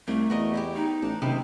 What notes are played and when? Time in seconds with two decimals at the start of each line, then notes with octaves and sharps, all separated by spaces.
0.08 C2 A3 A#3
0.30 E2 F#4 A#4 D#5
0.54 E4 F4 G4
0.76 D#4
1.02 A1 D4
1.22 F#1 C3 D#3 E4